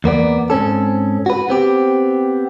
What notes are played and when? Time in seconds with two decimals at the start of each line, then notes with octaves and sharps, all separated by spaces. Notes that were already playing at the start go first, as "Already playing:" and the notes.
0.04 E2 A#3 B3 D5
0.50 G#2 C4 C#4 A4
1.26 F#4 B4
1.49 B3 C4 G4